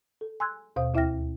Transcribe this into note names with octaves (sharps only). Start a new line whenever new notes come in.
A4
G#5 C6 E6 F#6 G#6
D#2 B2 C5 F5 D#6
D2 E4 E5 G5 F6 A#6